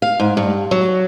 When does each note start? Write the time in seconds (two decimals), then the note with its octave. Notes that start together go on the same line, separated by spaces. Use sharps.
0.02 F5
0.20 G#2
0.37 G2
0.71 F#3